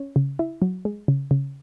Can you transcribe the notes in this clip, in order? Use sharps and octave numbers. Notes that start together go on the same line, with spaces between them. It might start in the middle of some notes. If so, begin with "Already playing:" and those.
Already playing: C#4
C#3
E4
F#3
G#3
C#3
C#3